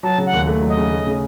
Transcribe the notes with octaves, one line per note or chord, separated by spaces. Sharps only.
F#3 A5
C#3
F#5
D#2
A3
F#3
D#5
C#3
A3
C#3